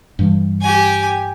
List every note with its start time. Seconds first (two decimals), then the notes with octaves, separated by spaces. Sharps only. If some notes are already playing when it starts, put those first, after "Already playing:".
0.19 G2 E3 G3
0.61 G4 G#5